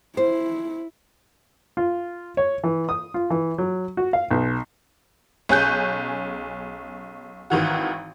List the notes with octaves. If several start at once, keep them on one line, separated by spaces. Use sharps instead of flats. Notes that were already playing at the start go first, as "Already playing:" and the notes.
E4 C5
F4
C#5
E3
D#6
F4
E3
F#3
F#4
F5
B1
B1 C#4 G#4 G#5 F#6 G6
G#1 D#3 E3 F#4